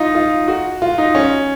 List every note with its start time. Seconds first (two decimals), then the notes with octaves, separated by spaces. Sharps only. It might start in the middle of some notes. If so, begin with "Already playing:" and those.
Already playing: D#4 F4
0.15 F4
0.48 F#4
0.82 F4
0.98 D#4
1.15 C#4